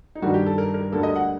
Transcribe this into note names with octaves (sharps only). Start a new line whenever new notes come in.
D#4
G2 D#3 G3 D4 F#4
G4
A4
A#4
A#4
D2 D3 G3 A#3 A4
D#5
F#5